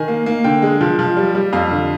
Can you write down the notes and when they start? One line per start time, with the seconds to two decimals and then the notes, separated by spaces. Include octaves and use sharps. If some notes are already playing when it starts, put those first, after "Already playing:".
Already playing: D#3 G#5
0.08 A#3
0.26 A#3
0.44 D3 G5
0.62 G#3
0.81 F3
0.99 F3
1.17 G3
1.35 G3
1.53 F2 F5
1.71 D3